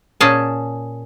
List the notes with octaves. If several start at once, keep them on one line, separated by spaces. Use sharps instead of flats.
A#2 C#4 G#4 A5